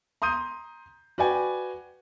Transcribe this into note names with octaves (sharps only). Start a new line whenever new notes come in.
A#5 C6 D#6 G6 D#7
F#4 B4 D5 G5 G#5